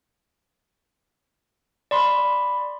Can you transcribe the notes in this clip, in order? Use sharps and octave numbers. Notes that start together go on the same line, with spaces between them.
D5 B5 C6